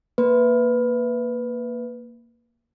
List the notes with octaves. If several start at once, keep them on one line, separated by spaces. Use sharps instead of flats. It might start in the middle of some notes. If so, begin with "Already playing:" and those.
A#3 B4